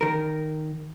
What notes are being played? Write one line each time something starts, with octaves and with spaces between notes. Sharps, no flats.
D#3 A#4